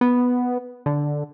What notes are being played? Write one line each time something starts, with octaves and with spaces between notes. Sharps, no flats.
B3
D3